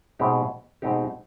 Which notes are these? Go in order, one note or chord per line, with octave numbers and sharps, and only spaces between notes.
B2 G#3 C4 D#4 G4
B2 G#3 C4 D#4 G4